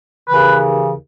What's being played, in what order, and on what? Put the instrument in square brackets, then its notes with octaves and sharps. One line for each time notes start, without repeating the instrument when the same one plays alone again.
[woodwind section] D#2 C#3 E3 B4